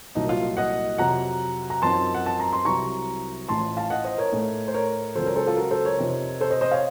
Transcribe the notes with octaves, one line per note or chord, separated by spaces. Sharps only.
C2 A#2 F#3 D#4
F4
D#5 F#5
F2 C3 F#3 F#5 A#5
A#5
F#2 F3 C4 D#4 A5 C6
F#5
A5
A#5
C6
C2 C3 F#3 A#5 C#6
A1 A2 F3 A5 C6
F5 A5
D#5 F#5
C5 D#5
A#4 C#5
A2 A3 D#4
C5
A#4 C#5
C#2 C#3 F#3 A4 C5
A#4 C#5
A4 C5
F4 A4
F#4 A#4
A4 C5
A#4 C#5
F2 C3 F3 C4 D#4
A4 C5
C5 D#5
C5 D#5
C#5 F5